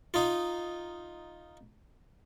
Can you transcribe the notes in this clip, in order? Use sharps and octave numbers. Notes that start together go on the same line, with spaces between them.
D#4 F4